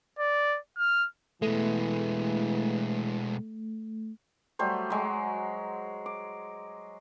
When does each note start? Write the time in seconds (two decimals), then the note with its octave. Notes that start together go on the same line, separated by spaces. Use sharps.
0.19 D5
0.78 F6
1.42 B2 E3 G#3 A3
4.59 F#3 G3 A3 C5
4.90 F#3 G#3
6.06 D6